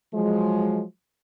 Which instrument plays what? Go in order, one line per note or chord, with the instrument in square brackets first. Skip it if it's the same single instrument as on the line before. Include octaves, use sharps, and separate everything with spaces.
[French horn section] F3 F#3 G#3